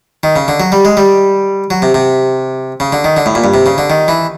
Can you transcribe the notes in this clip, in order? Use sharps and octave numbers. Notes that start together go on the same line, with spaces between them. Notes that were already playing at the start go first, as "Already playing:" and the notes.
D#3
C#3
D3
F#3
G3
G#3
G3
F#3
C3
C3
C#3
D3
D#3
D3
A2
A#2
G2
C3
C#3
D3
D#3
E3